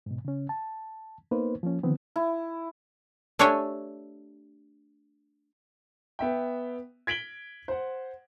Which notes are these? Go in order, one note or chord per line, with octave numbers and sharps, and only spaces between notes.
G#2 B2
C#3 C#4
A5
A#3 B3 D#4 B4 C5
F3 A#3 C#4
D3 D#3 F3 B3 C4
E4
A3 D4 G4 C#5 G5 G#5
B3 E5 G5
G#6 B6 D7 F#7 G7
C5 F#5